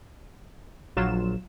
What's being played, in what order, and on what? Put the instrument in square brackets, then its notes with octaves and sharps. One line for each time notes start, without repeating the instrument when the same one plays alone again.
[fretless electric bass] A#1 [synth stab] F#3 F4 E7